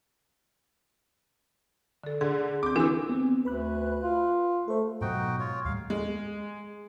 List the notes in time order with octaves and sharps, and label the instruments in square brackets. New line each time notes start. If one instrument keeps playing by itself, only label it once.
[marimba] D3 A4
[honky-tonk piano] D3 [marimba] G#4
[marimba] C4 [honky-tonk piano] D6 G6
[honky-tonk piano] E3 [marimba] D4 E4
[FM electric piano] B3 C4
[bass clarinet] D2 [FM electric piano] B4 B5 F#6
[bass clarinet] F4
[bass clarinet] A3 [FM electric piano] A4 C5
[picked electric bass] G#2 B2 F#3 [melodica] D#4 F#4 G5
[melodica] F4 C#5
[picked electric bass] D#2 A2 G3 [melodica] F5
[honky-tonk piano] G#3